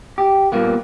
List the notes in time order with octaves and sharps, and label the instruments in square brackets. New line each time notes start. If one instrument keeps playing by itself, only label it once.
[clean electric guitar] G4
G2 A#2 A#3 B3